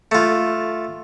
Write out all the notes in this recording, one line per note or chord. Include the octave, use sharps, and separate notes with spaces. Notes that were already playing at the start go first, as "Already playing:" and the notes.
A3 F4